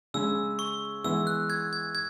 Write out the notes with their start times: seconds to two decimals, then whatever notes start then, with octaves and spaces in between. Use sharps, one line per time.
0.14 C#3 G#3 C#4 E6
0.59 C#6
1.04 E3 G#3 B3 E4 E6
1.27 F#6
1.50 G#6
1.73 G#6
1.95 G#6